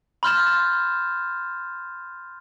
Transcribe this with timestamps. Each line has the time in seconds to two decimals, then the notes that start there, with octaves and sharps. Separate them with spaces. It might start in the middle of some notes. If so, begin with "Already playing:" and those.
0.23 B5 C6 F6 G6 A6 E7